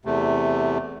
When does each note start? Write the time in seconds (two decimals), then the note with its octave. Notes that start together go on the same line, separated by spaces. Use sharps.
0.05 E2 C3 A3